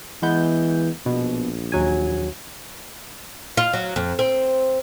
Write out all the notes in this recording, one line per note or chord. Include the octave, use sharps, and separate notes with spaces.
E3 G#3 B3 G6
A#1 B2
D#2 F#3 G#5
F4
F#3
F2
C4